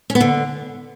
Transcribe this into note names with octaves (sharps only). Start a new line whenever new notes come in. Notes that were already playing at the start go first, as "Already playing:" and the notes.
C#4
B3
D3